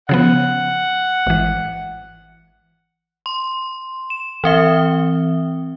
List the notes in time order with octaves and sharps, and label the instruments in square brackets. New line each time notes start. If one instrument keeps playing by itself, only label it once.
[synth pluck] C#3 F3 B3 [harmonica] F#5
[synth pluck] G#1 E3
[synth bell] C6
E7
E3 C4 E5